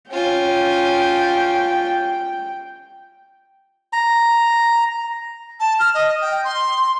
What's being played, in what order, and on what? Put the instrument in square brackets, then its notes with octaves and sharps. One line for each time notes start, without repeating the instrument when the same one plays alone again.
[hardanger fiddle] C#4 F4 [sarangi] G5
[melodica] A#5
[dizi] A5
F6
D#5
G5
C6